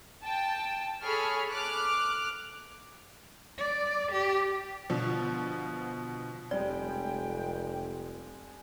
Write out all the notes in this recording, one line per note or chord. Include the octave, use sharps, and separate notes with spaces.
G5 A5
G#4 A4 C#5 A5 B5 F6
D6 F6 F#6
D5
G4
B2 D3 F3
F1 F2 G3 G#3 D5 G5